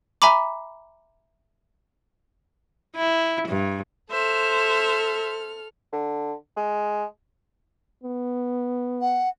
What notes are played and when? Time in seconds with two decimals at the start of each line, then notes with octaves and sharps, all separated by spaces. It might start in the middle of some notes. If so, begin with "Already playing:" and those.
0.22 E5 G#5 A#5 B5 D6
2.95 E4
3.48 G2
4.11 A4 C5 E5 F6
5.93 D3
6.56 G#3
8.03 B3
9.01 F#5